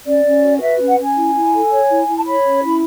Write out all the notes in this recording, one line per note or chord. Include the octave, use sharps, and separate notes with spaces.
C#4 D5
C#4
F#4
B4 E5
C#4
F#5
C#4 G#5
E4
E4
A4
C#5
E4
E4
A5
C#5 B5
C#4
E4